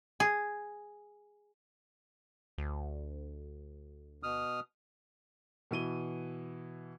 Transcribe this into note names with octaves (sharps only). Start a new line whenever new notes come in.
G#4
D2
B2 D#6 F6
B2 E3 D#7 G7